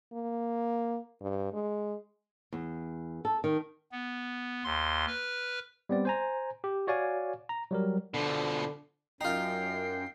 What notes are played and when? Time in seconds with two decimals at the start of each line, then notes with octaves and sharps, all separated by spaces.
0.13 A#3
1.21 G2
1.53 G#3
2.53 E2
3.25 A4
3.44 D#3
3.92 B3
4.64 D#2 C6
5.07 B4 F6
5.89 G3 B3 C4 D5
6.05 C5 G#5 A#5
6.64 G4
6.87 F#4 C#5 D5 F5 G#5
7.49 A#5
7.71 F#3 G3 A#4
8.14 B2 D3 F3
9.21 F#2 D#4 F4 G5 C7